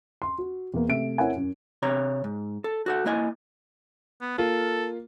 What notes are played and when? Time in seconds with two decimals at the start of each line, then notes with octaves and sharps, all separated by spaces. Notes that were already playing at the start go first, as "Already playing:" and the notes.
0.22 C6
0.38 F#4
0.74 E2 A#3
0.88 C3 A3 E5 D7
1.18 C4 E4 A#4 C#5 F#5 G#5
1.36 F#2
1.82 C3 C#5 A#5
2.24 G#2
2.64 A4
2.86 F#4 A4 F#5
3.06 A#3 E4 D#5 G#5
4.21 B3
4.38 A#3 F4 A4